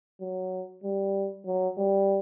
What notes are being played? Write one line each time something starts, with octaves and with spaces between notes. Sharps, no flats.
F#3
G3
F#3
G3